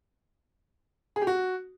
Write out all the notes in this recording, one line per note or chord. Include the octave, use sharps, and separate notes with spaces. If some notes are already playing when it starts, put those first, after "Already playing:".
G#4
G4
F#4